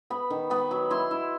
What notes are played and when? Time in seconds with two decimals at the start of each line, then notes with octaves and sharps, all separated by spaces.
0.10 B3 B5
0.30 D#3
0.50 B3 B5
0.71 F#3
0.90 E4 C6
1.11 E4